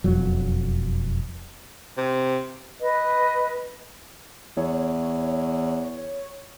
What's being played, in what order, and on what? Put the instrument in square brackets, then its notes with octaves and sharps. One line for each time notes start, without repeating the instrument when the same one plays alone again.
[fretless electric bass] E1 F2 F#3
[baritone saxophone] C3
[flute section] B4 D#5
[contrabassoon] E2 [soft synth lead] C#5